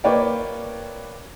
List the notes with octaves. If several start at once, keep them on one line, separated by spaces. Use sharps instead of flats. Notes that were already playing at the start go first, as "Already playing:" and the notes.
A#3 B4 C#5 D5 G5